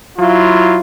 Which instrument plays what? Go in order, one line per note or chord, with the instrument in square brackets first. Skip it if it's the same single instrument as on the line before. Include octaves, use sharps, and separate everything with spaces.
[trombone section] F#3 E4 F4